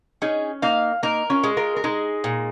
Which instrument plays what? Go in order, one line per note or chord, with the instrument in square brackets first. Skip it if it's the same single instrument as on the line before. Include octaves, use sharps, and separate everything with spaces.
[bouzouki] C#4 [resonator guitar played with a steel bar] D#4 G#4
[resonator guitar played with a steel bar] A#3 D#4 [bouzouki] F5
[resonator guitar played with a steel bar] A#3 D#4 [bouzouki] A#4
[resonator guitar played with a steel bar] C#4 F4
[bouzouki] G#3
[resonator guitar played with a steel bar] F4 A#4
A#4
[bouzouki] G#3 [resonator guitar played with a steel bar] D#4 G#4
[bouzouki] A#2